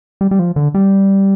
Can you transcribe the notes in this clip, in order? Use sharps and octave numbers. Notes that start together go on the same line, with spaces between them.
G3
G3
F3
D3
G3